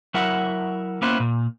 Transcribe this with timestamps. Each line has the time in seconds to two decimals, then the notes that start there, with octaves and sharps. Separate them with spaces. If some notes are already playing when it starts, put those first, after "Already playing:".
0.14 F#3 E4 A#4 E5 F#5
1.02 A#3 B3 C#4 E4 B4 C5
1.20 A#2